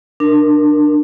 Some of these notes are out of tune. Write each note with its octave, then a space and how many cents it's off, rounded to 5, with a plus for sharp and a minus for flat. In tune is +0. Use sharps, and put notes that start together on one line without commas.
D4 +20 A#4 +0